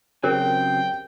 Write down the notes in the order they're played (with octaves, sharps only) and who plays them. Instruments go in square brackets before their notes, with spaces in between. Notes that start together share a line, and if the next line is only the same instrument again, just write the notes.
[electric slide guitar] C#3 F#3 C4 [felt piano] G4 [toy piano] G#4 A#4 C5 [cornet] G5